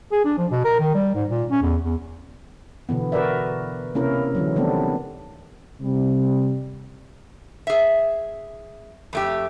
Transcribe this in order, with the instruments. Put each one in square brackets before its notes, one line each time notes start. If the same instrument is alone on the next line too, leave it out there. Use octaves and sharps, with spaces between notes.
[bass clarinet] G#4
D4
F3
B2
A#4
D#3
G3
G#2
A#2
C#4
E2
E2
[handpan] B2 D3 E3 B3
F#4 A#4 B4 D5 E5
C3 A#3 C#4 E4 A#4
D3 E3 F#3
D#3 G3 A3 B3 C4 D4
[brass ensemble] C3 G3
[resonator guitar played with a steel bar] G#4 E5
F2 A3 G4